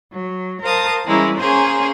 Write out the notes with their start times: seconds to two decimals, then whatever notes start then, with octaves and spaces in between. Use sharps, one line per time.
0.12 F#3
0.62 A#4 C5 F5 A5 D#6
1.05 E3 G3 G#3 A#3 C#4 E4
1.39 A#3 C#4 G#4 C5 F5 G#5